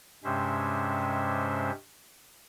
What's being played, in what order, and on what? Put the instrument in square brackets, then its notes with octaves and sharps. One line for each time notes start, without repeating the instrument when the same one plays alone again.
[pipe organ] G2 C3 G#3 C#4 C5 E5